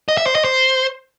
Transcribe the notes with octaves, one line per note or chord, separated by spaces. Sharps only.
D#5
E5
C5
D#5
C5